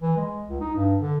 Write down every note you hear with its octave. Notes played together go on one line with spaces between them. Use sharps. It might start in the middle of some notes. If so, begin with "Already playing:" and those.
E3
G#3
C#2
D#4
G2
D3